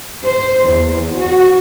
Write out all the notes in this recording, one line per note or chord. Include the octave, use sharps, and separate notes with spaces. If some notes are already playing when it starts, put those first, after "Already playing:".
C5
E2
F#4